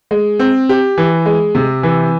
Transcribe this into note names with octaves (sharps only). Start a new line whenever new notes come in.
G#3
C4
G4
E3
G#3
C3
E3